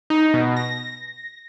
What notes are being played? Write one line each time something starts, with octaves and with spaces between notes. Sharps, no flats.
D#4
B2
A#6